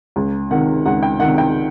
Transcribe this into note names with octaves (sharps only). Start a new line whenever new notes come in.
C#2
C3 D#3 F#5
C#2 F#5
G5
C3 D#3 F#5
G5